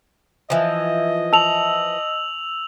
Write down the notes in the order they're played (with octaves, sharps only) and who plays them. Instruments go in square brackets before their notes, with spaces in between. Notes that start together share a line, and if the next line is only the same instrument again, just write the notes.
[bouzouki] E3 F3 [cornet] D#5
[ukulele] A5 [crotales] E6 F7 F#7